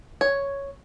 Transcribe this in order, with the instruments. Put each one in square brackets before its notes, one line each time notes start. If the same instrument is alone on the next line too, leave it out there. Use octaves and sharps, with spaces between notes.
[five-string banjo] C#5